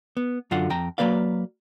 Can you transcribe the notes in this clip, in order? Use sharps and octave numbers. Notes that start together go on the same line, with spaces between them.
B3
F#2 D3 F4 F5 F#5
F2 G5 A#5
F#3 A3 A#3 B4 D5 F5